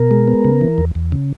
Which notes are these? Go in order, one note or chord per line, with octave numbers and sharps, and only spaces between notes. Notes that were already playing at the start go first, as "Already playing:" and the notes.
Already playing: B2 A#4
G#3
B3
C#3
E3
E2
E2
C#3